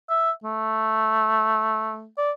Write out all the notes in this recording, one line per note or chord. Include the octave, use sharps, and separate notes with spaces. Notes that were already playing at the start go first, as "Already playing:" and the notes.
E5
A3
D5